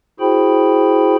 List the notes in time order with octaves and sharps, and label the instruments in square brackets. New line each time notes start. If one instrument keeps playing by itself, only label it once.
[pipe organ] E4 F#4 G#4 C5 G5 B5